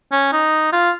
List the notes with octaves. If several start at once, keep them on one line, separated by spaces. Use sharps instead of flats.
C#4
D#4
F4